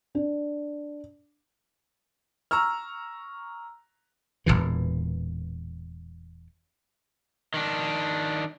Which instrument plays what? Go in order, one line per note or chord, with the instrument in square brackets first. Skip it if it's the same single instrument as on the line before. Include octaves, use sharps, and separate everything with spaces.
[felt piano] D4
[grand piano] A#5 C#6 E6 F6
[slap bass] E1 A#1 A#2 E3
[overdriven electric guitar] D#3 D4